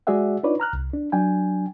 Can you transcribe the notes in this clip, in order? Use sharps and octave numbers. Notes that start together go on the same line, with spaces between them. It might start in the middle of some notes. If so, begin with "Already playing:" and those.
G#3 F#4 G#4 D5 E5 F#5
D4 D#4 F4 B4 C#5 D5
A#5 F6 F#6
C2
D4
F#3 D4 G5 G#5